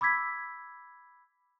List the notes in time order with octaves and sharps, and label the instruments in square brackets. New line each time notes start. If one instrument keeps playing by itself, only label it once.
[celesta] B5 D6 E6 G#6 B6